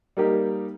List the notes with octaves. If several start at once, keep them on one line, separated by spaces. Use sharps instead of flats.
G3 A#3 D#4 G4 A#4